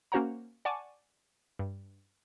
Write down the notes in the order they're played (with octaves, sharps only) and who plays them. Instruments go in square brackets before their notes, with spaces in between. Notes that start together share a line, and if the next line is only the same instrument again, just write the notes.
[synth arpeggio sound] A#3 C#4 F#4 C5 F#5 A#5
D5 F#5 G#5 A5 C#6 D6
G2